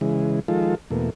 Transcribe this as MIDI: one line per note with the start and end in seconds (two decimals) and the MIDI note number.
0.01 0.40 49
0.01 0.40 52
0.01 0.40 56
0.48 0.75 51
0.48 0.75 53
0.48 0.75 56
0.48 0.75 65
0.48 0.75 69
0.91 1.10 40
0.91 1.10 47
0.91 1.10 57
0.91 1.10 58